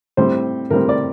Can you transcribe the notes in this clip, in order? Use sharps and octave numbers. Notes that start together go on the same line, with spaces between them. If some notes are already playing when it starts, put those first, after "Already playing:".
A2 G3 C4 C5
A2 G3 C4 A#4
D5